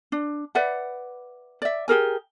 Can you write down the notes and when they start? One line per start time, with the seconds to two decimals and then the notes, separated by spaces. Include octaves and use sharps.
0.12 D4
0.55 B4 D5 E5 F#5
1.62 D5 E5
1.88 G4 G#4 A#4 G#5